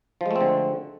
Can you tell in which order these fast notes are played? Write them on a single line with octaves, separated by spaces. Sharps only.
F3 G#3 A3 C4 D3